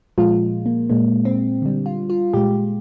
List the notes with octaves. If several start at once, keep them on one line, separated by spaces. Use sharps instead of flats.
A#2 F3 G#3 F4
A#3
A#2 G#3 A#3
C4
D3 G3
F4
F4
A#2 G#3 G4